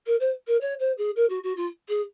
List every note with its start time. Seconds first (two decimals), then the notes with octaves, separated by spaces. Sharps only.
0.06 A#4
0.20 C5
0.47 A#4
0.61 C#5
0.79 C5
0.98 G#4
1.16 A#4
1.29 F#4
1.43 F#4
1.56 F4
1.88 G#4